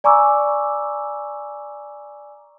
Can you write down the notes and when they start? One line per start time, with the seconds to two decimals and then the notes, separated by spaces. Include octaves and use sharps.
0.04 D5 G#5 A#5 C#6 D6 E6